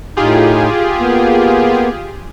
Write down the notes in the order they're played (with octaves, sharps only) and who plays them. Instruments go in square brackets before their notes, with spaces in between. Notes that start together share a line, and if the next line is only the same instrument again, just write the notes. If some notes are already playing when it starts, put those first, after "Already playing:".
[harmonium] A2 D#4 [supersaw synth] F4 G4 G#4
[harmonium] A#3 B3